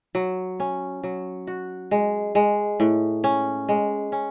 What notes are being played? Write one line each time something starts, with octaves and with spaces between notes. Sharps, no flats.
F#3
C#4
F#3
F#4
G#3
G#3
A2
C#4
G#3
C#4